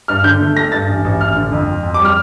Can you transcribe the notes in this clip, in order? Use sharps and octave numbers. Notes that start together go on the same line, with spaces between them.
G2 F6
D3 G6
A3
A3 A#6
G2 A6
A1
A1
A1 F6
D3
F2
F2
F2
D6
G3 F6